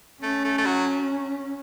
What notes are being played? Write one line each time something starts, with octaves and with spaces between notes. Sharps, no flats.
A3 C#4
A3
A3
F#3